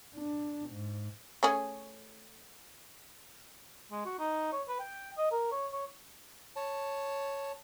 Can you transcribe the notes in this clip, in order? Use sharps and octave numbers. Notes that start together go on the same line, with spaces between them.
D4
G#2
A3 C#4 G#4
G#3
F#4
D#4
C#5
B4
G5
D#5
A#4
C#5
C#5
C#5 A5